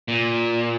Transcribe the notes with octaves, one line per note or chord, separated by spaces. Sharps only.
A#2